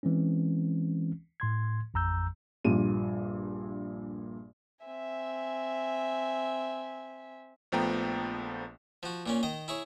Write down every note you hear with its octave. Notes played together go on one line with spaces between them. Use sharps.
E3 G#3 C4 C#4
A2 C6 G#6
A1 F2 A#5 E6 G6
A#1 G2 A#2 D#7
C4 E5 G#5
A#1 F3 A3 B3 G5 A#5
F3 F#4
A#2 A#3 C#4
D#3 D#5 A#5
E4 G#4 C#5